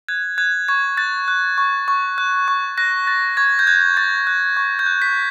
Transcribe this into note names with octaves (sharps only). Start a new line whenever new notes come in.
F#6 G#6
F#6 G#6
C#6 G#6
F#6 A6
F#6
C#6
C#6
F#6
C#6
F#6 A#6
F#6 A6
C#6 G#6
G6
F#6 G#6
C#6 A6
F#6
C#6
G6
F#6
B6